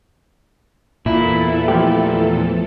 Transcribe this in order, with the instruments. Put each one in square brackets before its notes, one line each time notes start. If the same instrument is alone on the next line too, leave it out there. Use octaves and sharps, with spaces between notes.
[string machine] E2 E3 A4 [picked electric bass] A#2 [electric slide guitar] E4
[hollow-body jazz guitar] F3 A3 G4